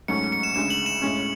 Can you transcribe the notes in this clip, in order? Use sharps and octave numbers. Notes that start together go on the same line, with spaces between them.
G#2 F#3 A3 C#4 C#7
C#7
E7
D2 C#3 G#3 E7
F#7
E7
A2 G#3 C#4